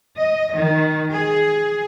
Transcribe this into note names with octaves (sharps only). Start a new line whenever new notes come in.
D#5
D#3
G#4